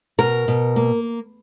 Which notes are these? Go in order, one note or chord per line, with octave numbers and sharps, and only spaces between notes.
B2 A#4
B2
A#3